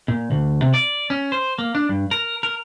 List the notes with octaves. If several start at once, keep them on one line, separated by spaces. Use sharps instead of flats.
A#2
D2
C3
D5
C#4
C5
A#3
D4
G2
A#4
A#4